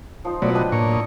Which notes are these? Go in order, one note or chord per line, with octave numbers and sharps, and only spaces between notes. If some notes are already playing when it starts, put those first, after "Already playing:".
F3 D#4 C5
B2 F#3 A3 E4 C#5 D5
D4 B4 D#5 G5
A2 A#3 D4 C#5
E4 D#5 D#6